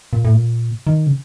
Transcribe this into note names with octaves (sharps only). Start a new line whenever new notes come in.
A#2
A2
A#2
D#3
C#3